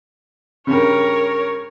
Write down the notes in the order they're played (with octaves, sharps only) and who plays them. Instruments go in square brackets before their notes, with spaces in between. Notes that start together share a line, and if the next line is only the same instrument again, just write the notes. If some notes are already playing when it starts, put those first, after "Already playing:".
[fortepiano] G2 C#3 [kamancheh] A#4 C#5